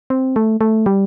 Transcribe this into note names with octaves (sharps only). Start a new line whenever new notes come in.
C4
A3
A3
G3